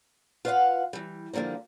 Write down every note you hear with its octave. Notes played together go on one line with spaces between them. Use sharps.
F4 B4 C5 D#5 F5 F#5
E3 G3
D3 F3 G3 A#3 C4